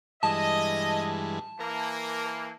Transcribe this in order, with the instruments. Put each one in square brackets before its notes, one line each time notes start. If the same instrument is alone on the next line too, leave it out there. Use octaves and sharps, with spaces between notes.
[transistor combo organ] G2 E3 G#3 [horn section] D#5 [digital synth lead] A5
[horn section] E3 A#3 [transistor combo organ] A#4